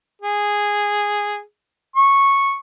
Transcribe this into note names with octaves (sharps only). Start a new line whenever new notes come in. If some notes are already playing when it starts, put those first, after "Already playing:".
G#4
C#6